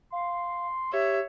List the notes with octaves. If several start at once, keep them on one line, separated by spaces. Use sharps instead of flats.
F5 C6
G4 C#5 E5